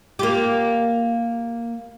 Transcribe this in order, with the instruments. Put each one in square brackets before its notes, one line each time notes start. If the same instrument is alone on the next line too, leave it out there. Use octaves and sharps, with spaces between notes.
[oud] A#3 F4 G4